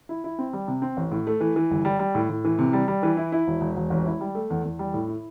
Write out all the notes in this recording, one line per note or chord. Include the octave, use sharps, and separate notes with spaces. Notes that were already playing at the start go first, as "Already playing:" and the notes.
E4
E4
C4
G3
C3
C4
A1
A2
A3
E3
E3
G1
G3
G3
A2
A2
E3
C3
G3
G3
E3
E4
E4
E1
E1
E1
A1
E4
G3
A3
E2
E2
G3
A2
E4